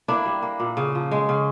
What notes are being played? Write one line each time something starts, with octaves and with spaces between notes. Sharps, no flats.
A#3 D4 E4
G3
A#3
A#2
C#3
F3
G#3
C#3